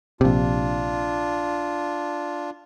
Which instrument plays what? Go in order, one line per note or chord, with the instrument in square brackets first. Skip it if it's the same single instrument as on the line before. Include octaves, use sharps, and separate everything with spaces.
[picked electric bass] A#1 C3 [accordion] D4 F4